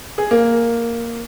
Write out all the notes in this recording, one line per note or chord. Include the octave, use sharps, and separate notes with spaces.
G#4
A#3